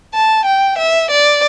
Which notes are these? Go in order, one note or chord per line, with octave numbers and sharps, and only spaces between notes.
A5
G5
E5
D5